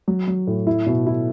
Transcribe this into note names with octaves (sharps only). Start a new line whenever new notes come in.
F#3
F#3
A2
E4
B2
E4